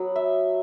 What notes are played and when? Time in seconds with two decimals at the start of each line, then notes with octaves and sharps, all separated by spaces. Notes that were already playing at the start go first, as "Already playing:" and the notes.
Already playing: F#3 B3
0.16 E5